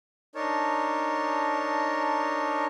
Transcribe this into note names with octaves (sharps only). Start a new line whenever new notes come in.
D4 D#4 A#4 C#5 A5